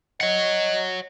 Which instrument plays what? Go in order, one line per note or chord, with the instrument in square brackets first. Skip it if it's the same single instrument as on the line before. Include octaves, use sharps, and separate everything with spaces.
[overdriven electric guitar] C#5 F#5 [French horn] D#5